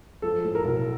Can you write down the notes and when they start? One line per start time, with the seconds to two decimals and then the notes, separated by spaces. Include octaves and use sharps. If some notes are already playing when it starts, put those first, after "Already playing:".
0.22 F3 A4
0.44 A2
0.55 A#4
0.65 B1